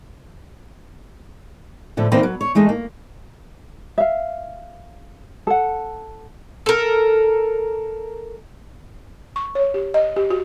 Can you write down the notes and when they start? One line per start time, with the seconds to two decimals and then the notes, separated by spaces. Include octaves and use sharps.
1.97 A2 D3 F3
2.11 D2 D#3 A#3 C4 B4 C5
2.23 F#3
2.41 C#5
2.55 E3 G#3 A3 D#4
2.69 A#3
3.98 E5 F5
5.47 A4 F#5
6.66 A4 A#4
9.36 C#6
9.55 C#5
9.74 G4
9.94 D#5
10.16 G4
10.30 F#4